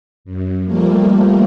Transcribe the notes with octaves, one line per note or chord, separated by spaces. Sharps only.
F#2
F3 G3 A3 A#3